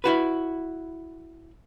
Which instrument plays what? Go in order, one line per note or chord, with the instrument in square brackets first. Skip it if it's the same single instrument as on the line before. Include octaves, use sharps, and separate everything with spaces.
[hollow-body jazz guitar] E4 F#4 B4